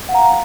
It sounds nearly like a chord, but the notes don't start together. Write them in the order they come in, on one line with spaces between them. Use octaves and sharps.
F#5 F5 A#5